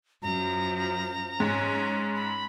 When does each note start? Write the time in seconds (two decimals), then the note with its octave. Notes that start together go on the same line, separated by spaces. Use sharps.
0.22 F#2 F3 A#5
1.40 G#2 C#4
2.15 B5